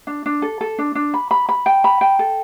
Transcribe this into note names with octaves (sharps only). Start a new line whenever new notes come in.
D4
D4
A4
A4
D4
D4
B5
B5
B5
G5
B5
G5
A4